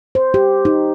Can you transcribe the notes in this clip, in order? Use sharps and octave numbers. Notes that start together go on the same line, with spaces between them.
C5
G4
D#4